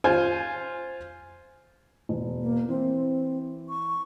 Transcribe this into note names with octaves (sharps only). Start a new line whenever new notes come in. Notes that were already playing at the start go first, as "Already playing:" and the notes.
F4 C5 G#5
E1
A#3
E3 C4
C#6